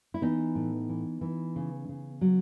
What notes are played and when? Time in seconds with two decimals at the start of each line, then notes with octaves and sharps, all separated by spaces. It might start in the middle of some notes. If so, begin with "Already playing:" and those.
0.14 E4
0.22 E3 B3 D#4
0.55 A2
0.89 E3
1.21 E3
1.56 C#3
1.89 C#3
2.21 F#3